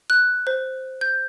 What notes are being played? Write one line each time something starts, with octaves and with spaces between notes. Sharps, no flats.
F#6
C5
G6